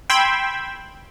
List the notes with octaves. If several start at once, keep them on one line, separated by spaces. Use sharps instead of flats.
G5 B5 C6 E6 G#6